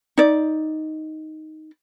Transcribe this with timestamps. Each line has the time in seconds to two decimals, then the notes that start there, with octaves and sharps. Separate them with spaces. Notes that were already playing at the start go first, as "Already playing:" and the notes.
0.18 D#4 D5